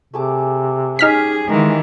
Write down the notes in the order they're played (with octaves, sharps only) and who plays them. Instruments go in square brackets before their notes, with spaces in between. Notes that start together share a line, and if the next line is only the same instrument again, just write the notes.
[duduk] C3 [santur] A3 G#4 D6
[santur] C#4 G4 [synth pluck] D#4 F6 B6 [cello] G#4
[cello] D#3 E3 [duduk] G#3 [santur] G4 F5